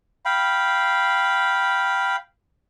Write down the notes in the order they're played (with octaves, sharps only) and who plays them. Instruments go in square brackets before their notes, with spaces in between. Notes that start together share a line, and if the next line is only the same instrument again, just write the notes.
[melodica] F5 G5 B5